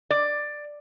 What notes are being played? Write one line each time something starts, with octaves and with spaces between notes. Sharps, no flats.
D5